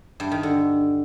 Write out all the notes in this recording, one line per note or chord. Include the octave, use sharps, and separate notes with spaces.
G2
D#3
D3